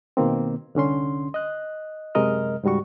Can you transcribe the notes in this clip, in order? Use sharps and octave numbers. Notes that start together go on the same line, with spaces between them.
B2 D#3 A#3 C4
C2 D3 C#4 C6
D#5 F#6
F#2 C3 G#3 A#4 D#5 F6
C#2 G#2 G3 F#4 C#6